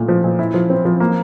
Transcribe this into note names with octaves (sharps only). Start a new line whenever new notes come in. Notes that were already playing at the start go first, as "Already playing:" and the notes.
Already playing: A#2 A3
F3
A#2
E4
F3
C4
F3
A#3